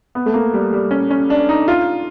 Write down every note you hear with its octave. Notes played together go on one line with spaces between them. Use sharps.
B3
A3
A#3
G3
G3
C#4
C#4
D4
D#4
F4